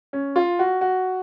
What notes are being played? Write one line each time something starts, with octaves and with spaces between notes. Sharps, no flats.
C#4
F4
F#4
F#4